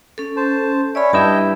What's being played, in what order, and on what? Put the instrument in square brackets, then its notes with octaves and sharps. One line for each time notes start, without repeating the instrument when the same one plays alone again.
[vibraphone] C#4 A4
[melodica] C5 A5
[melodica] C#4 C#5 E5 [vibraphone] D5 B5
[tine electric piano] G2 E4 E6 [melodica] D#5 G5 [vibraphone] A5